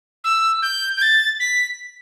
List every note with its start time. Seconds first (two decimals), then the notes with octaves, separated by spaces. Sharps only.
0.24 E6
0.62 G6
0.97 G6
1.02 A6
1.40 B6